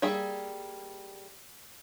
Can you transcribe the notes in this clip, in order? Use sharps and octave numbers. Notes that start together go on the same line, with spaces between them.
G3 A#3 G#4 E5